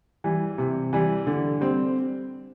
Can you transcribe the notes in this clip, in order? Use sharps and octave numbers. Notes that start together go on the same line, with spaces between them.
E3 G3
C3
E3 G3
D3
G3 C4